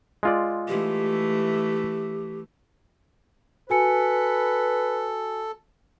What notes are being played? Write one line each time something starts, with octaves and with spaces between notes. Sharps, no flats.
G#3 F4 D5
E3 A3 G4
F#4 A4 B4 G#5 C#7